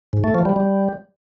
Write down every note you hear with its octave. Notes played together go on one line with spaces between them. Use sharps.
G#2
A3
F3
G3
G3